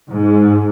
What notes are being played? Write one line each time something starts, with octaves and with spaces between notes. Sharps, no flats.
G#2